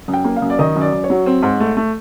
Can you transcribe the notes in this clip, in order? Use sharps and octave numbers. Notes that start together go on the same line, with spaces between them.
F#2
G5
A#3
F5
F#2
D5
D#3 D#5
F#2
D5
F#2
C#5
F#3
C4
G#2
A3
A3